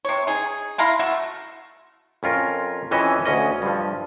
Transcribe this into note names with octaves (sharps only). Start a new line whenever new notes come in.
C3 C#5
D#4 G#4
E4 F5 A#5 C6
A3 F#4 E5
F2 C#4 F4 A#4
F2 E3 C#4 D#5 E5
D2 C#4 D#5
G2 F3